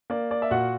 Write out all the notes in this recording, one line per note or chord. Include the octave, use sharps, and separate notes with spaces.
A#3 D5
D5
E5
A#2 F#4 F#5